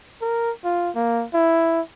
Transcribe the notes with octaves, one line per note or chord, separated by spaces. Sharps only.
A#4
F4
A#3
E4